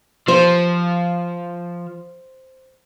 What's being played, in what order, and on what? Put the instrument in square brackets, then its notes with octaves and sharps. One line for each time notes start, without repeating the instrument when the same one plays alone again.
[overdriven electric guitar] F3 [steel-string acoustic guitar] C5